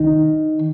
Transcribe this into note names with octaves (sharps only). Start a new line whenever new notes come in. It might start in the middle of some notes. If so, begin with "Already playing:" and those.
Already playing: D#3